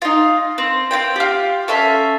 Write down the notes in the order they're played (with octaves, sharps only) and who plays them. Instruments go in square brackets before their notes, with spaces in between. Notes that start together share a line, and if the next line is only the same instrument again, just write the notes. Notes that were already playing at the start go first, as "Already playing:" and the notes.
[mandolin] D#4 F4
C4
C4 C#4 F4 G5
F4 G4
C#4 A4 E5 F5